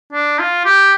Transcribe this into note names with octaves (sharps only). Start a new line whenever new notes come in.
D4
F4
G4